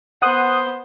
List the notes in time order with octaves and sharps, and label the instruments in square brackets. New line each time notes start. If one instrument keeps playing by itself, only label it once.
[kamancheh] B3 C5 [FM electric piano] F#5 D#6 F#6